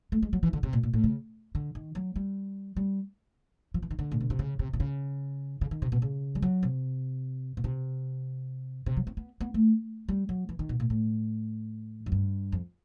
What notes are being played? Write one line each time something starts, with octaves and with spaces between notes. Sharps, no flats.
A3
G#3
F#3
E3
D3
C3
A#2
A#2
A2
C#3
D3
D#3
F#3
G3
G3
F3
E3
D#3
D3
A#2
B2
C3
C#3
C3
C3
C#3
C#3
D#3
C3
B2
C#3
G3
F#3
C3
B2
C3
C3
F#3
C4
B3
B3
A3
G3
F#3
E3
D#3
B2
A#2
A2
F#2
G2
F2